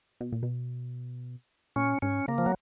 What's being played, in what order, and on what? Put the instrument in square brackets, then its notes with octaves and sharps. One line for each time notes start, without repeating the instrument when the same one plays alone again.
[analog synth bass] B2
A#2
B2
[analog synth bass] A#2 [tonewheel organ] C#4
[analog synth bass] G#2 [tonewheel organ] C#4
[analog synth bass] C#3 [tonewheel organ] A#3
[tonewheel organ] F3
F#3